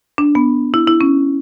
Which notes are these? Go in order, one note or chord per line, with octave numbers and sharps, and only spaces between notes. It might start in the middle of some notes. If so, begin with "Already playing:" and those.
D4
B3
E4
E4
C#4